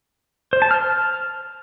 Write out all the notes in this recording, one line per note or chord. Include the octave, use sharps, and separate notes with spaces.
C5
A5
F6